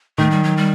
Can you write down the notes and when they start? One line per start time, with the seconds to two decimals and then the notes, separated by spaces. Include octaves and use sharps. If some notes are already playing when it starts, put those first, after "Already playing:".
0.18 D#3 A3
0.31 G3
0.44 F#3
0.57 G3